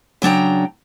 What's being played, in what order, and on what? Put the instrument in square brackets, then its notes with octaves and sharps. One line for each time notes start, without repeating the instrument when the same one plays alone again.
[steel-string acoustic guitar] C#3 F#3 D4 G5 A#5